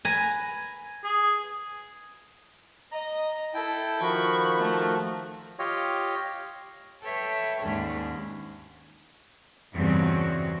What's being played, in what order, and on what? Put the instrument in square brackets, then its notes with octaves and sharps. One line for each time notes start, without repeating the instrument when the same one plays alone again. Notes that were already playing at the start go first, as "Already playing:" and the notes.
[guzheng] B4 G#5 A#5
[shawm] G#4
[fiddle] D#5 [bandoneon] A#5
[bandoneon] E4 G5 [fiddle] A4
[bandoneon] D#3 F3 F#4 [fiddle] B5 C#6
[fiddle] A3
[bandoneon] F4 G4 C#5 D#5
[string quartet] A4 B4 C#5 E5 G5
D#2 G#2 G#3 C#4 D4
[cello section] E2 G2 C#3 C4 F#4